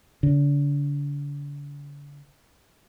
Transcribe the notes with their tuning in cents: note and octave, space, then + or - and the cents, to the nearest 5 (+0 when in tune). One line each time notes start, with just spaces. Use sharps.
D3 -40